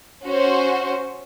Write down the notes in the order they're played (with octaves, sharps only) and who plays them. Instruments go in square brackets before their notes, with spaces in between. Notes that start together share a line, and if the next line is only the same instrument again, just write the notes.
[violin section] C#4 F#4 C5